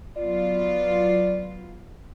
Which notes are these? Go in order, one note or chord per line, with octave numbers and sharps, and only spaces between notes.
F#3 B3 F4 D5